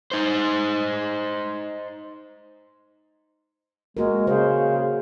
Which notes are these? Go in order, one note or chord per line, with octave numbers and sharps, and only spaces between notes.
D#4 C5
G#3 A#3 F#4 A#4
C#3 C5